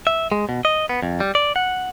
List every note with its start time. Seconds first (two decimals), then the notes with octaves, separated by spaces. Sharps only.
0.07 E5
0.32 G#3
0.49 B2
0.65 D#5
0.89 B3
1.02 F2
1.20 G3
1.35 D5
1.56 F#5